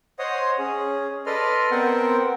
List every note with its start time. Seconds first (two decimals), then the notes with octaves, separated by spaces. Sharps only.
0.19 C5 C#5 D#5 F#5 C6 D#6
0.58 C#4 G#4
1.26 A4 B4 D5 D#5 C6 F6
1.71 B3 C4 A#4 C5 F#5 G5